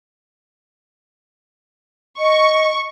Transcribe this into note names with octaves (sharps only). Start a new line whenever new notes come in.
D#5 C#6